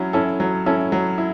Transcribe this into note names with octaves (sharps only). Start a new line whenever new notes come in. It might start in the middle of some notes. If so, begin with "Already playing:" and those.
Already playing: F#3 C#4 E4
C#4 E4 A4
F#3
C#4 E4 A4
F#3
E4